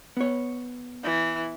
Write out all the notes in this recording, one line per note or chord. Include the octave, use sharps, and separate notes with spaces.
B3 C#5
E3